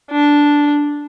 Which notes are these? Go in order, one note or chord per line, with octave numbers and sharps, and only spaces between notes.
D4